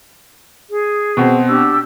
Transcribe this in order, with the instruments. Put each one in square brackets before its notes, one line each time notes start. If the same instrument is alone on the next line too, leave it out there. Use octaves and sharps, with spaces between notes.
[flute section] G#4
[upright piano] B2 C4
[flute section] D4 G4 E6